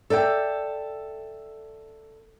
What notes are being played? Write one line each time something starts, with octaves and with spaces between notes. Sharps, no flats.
A4 D5 E5 G5